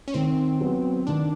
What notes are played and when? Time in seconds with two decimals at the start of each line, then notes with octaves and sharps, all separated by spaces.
0.08 C#4
0.14 D#3 C4
0.61 F#3 B3
1.07 D#3 D4